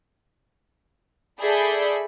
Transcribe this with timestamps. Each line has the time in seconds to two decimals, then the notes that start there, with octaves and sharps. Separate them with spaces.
1.41 G#4 A4 D5 E5 B5 G6